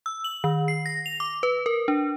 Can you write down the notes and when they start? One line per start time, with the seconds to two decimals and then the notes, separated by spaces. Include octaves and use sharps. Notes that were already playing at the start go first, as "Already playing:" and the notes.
0.06 E6
0.24 F#7
0.44 D#3
0.68 C7
0.86 A#6
1.06 F7
1.20 D6
1.43 B4
1.66 A#4
1.88 D4